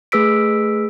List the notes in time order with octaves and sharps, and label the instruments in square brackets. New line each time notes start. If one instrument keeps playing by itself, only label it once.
[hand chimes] A3 G#4 B4 E6 B6 D7